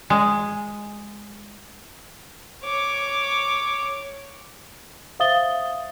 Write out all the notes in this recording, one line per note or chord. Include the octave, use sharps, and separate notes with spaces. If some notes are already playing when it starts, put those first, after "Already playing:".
G#3
C#5 D6
C5 E5 F5 D#6 A6 G7